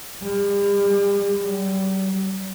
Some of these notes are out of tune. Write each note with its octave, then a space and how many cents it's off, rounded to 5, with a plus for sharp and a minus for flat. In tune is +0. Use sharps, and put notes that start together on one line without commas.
G3 +40
G3 -40